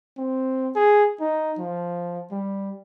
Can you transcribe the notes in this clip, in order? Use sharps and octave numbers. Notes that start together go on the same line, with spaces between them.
C4
G#4
D#4
F3
G3